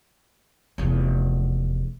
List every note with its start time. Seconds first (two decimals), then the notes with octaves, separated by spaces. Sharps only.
0.78 F1 E2